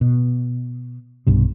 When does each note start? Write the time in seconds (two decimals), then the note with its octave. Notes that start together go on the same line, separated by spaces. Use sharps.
0.01 B2
1.27 B1 G2 C3